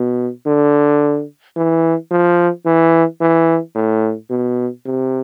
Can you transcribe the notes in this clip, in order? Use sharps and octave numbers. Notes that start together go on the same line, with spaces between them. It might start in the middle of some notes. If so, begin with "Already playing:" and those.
Already playing: B2
D3
E3
F3
E3
E3
A2
B2
C3